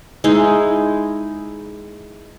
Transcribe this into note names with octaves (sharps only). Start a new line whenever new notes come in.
G#3 D#4 E4